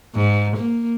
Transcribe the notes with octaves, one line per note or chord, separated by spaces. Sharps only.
G#2
A#3